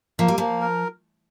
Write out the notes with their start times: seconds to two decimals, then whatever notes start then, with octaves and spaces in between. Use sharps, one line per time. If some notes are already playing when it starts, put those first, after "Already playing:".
0.19 F3 A#3
0.28 G3
0.38 F3 A#3
0.61 A#4